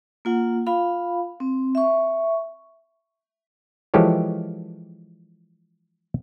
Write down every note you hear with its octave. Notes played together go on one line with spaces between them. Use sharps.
A#3 F4 F#5
F4 F5 B5
C4
E5 C#6
E3 F3 G#3 G4 A4 C#5